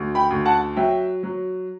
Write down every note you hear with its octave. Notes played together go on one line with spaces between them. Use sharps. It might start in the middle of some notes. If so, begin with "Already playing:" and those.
Already playing: D2
G5 B5
D2
F#5 A5
F#3 E5 G5
F#3